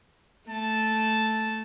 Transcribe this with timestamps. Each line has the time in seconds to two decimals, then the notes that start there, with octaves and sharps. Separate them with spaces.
0.49 A3 A5